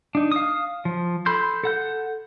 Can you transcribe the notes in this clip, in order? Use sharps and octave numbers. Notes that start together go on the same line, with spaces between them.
D4 D#4
F5 D#6
F3
A4 B5 C6 G6
A4 F#5 G6